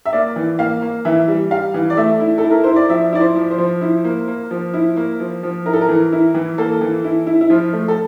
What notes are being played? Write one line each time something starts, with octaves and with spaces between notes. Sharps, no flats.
E5
A#3 D5
E3
A#3 F5
A#3
E3 E5
G3
G3 F5
E3
D5
A3 E5
E4
A4
E4
A#4
E4 C5
D5
F3 E5
E4 D5
C5
F3
C5
F3
E4
A#3
A#3
F3
E4
A#3
F3
F3
E4 A#4
A4
A#4
E3
E4
E3
A#3 A4
E3
E4
E4
E4
F3 F4
A3
A4